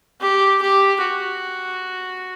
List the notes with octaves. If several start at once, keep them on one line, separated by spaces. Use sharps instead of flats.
G4
G4
F#4